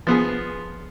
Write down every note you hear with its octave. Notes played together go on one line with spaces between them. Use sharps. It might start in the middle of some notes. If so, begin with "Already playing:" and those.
F3 B3 G#4